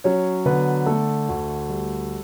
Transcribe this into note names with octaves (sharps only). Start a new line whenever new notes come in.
F#3 C#4 C#5
D3 B3 B4
A3 A4
D2
G3